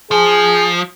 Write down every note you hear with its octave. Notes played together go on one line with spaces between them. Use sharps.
F3 G#4